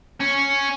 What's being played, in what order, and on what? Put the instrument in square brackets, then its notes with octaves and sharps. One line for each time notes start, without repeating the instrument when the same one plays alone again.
[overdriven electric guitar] C#4